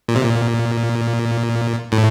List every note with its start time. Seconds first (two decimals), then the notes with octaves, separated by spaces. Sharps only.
0.08 A#2
0.16 C3
0.24 A#2
1.92 A2